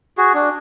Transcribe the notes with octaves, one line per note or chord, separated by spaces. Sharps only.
F#4 G#4
D4